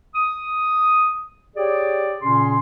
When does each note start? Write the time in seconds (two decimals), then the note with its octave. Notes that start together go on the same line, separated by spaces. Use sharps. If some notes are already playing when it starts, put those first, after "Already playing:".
0.14 D#6
1.57 G4 G#4 C#5 D5
2.22 A#2 C#3 C#4 C6